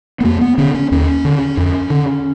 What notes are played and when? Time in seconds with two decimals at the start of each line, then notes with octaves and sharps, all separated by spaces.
0.21 B3
0.24 F2 A#3
0.41 B3
0.58 D3 C#4
0.74 C#4
0.92 D#2 C#4
1.25 D3
1.57 F2
1.90 D3